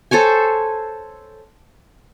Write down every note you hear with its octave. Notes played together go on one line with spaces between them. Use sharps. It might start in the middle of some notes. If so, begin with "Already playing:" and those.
A4 C5 C#5 G#5